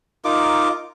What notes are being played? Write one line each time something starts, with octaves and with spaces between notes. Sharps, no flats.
D#4 F4 A#4 D6